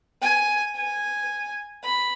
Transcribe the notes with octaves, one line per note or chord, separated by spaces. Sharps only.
G#5
G#5
B5